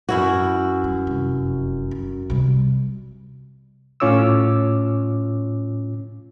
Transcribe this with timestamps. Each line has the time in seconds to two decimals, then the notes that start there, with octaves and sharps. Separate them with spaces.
0.09 F#2 E4 F#4
0.84 G3
1.07 F1
1.91 C#4
2.30 C3 G3
4.00 A2 C#4 F4 C#5 D6 E6